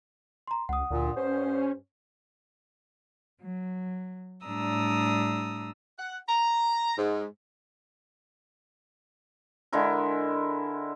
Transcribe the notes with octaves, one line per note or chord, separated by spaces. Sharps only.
A#5 C6
C#2 F#5 D#6
D2 A#2
G2 C#4 C5
F#3
A2 G3 D4 A#5 D#6 E6
F#5
A#5
G#2
D3 G#3 E4 A#4